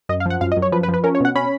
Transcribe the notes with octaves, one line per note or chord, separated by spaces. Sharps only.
F#2 D#5
F5
F3 F#5
F#2 F5
D#5
F#2
C#5
F3 B4
B4
F3
B4
C#4 A#4
C#5
B2 F#5
C#4 B5